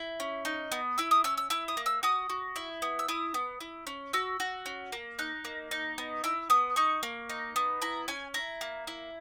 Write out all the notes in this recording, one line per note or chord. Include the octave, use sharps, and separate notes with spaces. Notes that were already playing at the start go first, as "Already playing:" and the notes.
Already playing: E4
C#4
D#4
B3
E4 E6
D#6
C#4 E6
E6
E4 E6
D#6
A#3
E6
F#4 D#6
F#4
E4
B3
E6
E4 D#6
B3
E4
C#4
F#4 E6
F#4
C#4
A#3
D#4 F#6
A#3
D#4
B3
E4 E6
B3 D#6
D#4 C#6
A#3
D#4
B3
E4 A#5
C#4 G#5
E4 A#5
A#3
E4